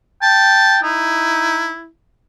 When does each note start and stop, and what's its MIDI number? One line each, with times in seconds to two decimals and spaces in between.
0.22 0.80 79
0.22 0.78 81
0.83 1.70 63
0.83 1.88 64